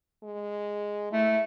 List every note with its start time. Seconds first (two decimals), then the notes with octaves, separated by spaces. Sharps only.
0.23 G#3
1.12 A3 E4